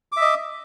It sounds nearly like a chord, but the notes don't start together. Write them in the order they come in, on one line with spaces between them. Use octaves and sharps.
D6 E5 D#5